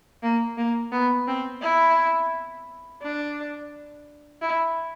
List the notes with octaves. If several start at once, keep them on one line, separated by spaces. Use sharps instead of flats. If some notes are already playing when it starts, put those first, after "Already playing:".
A#3
A#3
B3
C4
E4
D4
E4